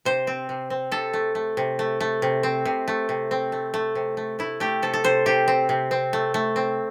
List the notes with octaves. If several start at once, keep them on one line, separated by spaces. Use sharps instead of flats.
C3 C5
C4
C3
C4
C3 A4
A3
A3
C3
A3
A3
C3
C4
C3
A3
C3
C4
A3
A3
C3
A3
A3 E4
A3 G4
C3 A4
A4
C3 C5
C3 G4
C4
C3
C4
A3
A3
C4